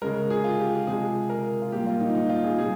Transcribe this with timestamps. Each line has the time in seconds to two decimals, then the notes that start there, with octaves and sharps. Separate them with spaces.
0.02 C#3 G#3 A#4
0.30 G#4
0.44 F4
0.59 G4
0.73 G4
0.87 C3 F3 G#3 G#4
1.29 A#4
1.62 F4
1.72 A#2 G3 A#3 G4
1.87 F4
2.00 D#4
2.15 D#4
2.30 F4
2.44 G#4
2.58 C3 G3 G#4